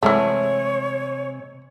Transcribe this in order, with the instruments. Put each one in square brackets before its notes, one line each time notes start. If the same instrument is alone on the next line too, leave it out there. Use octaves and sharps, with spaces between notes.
[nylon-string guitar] C3 G#3 [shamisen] E3 A3 [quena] C#5